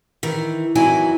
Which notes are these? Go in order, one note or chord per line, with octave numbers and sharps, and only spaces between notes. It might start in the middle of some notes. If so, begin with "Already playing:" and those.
D#3 E3
F2 D#3 E3 F#3 E4 G#5